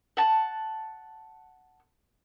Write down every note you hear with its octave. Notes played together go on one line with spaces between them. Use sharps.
F#5 A5